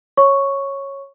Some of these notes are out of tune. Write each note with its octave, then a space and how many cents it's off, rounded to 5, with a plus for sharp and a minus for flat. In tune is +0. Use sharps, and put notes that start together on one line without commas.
C#5 -10 C#6 +0